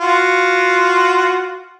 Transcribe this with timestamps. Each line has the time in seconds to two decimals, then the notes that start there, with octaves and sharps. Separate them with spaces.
0.01 F4 F#4